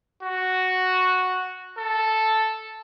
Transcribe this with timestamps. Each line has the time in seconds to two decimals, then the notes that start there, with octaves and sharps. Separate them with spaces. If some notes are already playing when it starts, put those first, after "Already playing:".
0.23 F#4
1.78 A4